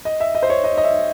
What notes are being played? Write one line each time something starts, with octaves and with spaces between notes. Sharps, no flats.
D#5
E5
D#5
C5
C#5
D#5
D#5
E5